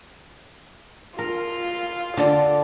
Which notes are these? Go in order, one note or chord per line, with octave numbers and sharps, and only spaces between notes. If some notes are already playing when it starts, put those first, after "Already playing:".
F4 A#4
D3 A4 D5 C6